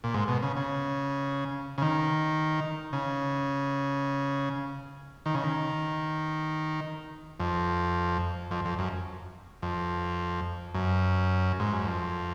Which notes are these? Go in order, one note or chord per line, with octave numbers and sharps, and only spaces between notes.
A#2
G#2
B2
C#3
C#3
C#3
D#3
C#3
D#3
C#3
D#3
F2
F2
F2
F#2
F2
F#2
G#2
F#2
F2